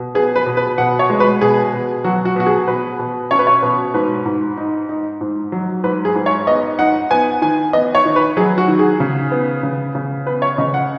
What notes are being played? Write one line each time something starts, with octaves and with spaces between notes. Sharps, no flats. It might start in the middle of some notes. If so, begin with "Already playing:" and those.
Already playing: B2
B3 G#4
B4
B2
B4
B2 F#5
C#5
G#3
B4
B2 G#4
B2
F#3 F#4
F#4
B2 F#4
G#4
B2 B4
B2
C#4 C#5
B4
C#5
B2 B4
G#2 B4
G#2
D#4
D#4
G#2
F#3
G#2 B4
G#4
G#2
C#5
B3 D#5
D#4 F#5
B3 G#5
D#3 G#5
B3 D#5
C#5
D#3
B4
F#3 G#4
F#4
D#3
G#4
C#3
B3
C#3
C#3
B3 B4
C#5
C#3 D#5
F#5